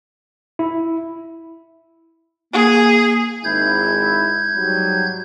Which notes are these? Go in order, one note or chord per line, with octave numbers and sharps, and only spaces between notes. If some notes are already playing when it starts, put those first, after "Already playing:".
E4
A#3 G#4
G#1 G#2 E4 G6 G#6
G#2 F#3 G3